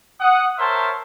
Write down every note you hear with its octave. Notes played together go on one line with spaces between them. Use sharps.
F#5 D#6
A#4 C5 C#5 E5 A5 C6